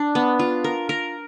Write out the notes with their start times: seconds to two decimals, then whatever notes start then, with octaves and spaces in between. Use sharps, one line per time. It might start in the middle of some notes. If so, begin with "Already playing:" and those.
Already playing: D4
0.15 B3
0.39 F4
0.64 A#4
0.89 A#4